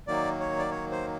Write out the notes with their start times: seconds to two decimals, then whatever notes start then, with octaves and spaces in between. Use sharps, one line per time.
0.08 D#3 F#3 A#3 D5
0.40 C#5
0.59 D5
0.71 C#5
0.91 C5